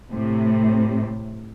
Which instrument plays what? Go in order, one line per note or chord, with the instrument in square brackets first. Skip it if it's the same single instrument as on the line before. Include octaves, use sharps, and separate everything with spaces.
[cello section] A2 C3